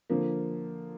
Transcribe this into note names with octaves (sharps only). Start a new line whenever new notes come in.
D3 F3 A#3